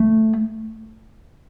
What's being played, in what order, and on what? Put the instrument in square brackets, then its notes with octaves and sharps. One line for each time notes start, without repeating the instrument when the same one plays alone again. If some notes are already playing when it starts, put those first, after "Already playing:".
Already playing: [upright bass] A3